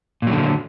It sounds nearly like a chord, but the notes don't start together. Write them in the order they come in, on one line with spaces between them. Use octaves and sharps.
A#2 F#3 D3